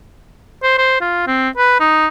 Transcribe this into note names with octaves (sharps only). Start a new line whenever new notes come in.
C5
C5
F4
C4
B4
D#4